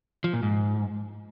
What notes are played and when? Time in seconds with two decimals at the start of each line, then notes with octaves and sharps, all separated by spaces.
0.24 F3
0.33 A#2
0.43 G#2